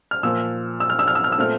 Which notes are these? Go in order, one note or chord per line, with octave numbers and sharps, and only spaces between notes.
F6
A#2 F3 A#3 E6
E6
F6
E6
F6
E6
F6
E6
A#2 A3 C4 F6